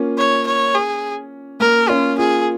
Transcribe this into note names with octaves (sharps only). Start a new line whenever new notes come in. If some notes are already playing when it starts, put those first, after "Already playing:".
Already playing: A#3 C#4 F4
C#5
C#5
G#4
A#3 A#4
C#4 F4
F4 G#4